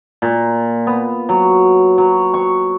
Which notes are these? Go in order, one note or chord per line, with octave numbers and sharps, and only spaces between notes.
A#2
B3
F#3
F#3
C#6